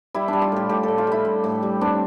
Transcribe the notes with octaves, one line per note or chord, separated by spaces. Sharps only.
G3 E4
G3 D4
F4
A2 G4
A2 G4
A2 A4
F4
G3 E4
G3
A2
G3
C4 D4